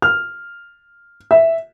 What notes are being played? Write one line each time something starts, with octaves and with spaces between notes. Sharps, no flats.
F6
E5